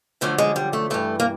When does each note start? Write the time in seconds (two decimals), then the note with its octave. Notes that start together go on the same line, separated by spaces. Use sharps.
0.21 F#2 D3 F3 A3
0.38 G#3
0.56 G3
0.73 A3
0.90 G2 E3 A3
1.20 A#3